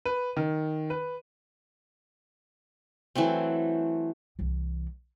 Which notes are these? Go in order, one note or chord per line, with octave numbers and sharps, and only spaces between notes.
B4
D#3
B4
E3 F#3 A3 C4
C2 E3